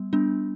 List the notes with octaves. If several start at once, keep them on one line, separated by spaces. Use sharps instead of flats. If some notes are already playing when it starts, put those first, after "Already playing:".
Already playing: G3 B3
G3 B3 D4